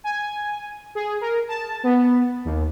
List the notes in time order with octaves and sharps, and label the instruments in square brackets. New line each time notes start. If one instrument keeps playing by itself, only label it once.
[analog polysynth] G#5
G#4
A#4
A5
B3
D#2